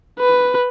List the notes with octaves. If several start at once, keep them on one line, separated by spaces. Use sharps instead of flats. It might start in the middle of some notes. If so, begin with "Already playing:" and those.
B4